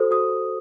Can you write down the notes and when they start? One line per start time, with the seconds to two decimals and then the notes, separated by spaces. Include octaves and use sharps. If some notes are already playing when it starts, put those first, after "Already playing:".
Already playing: F#4 A4 C5 D#6
0.11 F#4 D#6